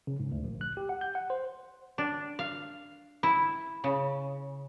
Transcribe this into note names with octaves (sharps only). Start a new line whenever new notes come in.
C#3
G#2
D2
A#1
F#6
G4
F#5
G6
F#5
C5
D4
F5
E4
C#3